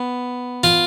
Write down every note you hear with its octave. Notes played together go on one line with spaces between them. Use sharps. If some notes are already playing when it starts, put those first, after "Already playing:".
Already playing: B3
F4